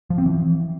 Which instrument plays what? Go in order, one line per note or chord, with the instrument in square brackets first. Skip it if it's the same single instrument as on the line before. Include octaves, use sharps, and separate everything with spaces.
[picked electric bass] F3
C4
E3